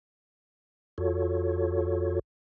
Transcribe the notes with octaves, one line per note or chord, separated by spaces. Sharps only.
F2 F4 F#4 A4 C#5